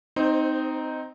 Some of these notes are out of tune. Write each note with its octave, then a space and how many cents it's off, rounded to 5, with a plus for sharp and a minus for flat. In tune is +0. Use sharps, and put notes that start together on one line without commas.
C4 -15 D#4 +0 C5 +15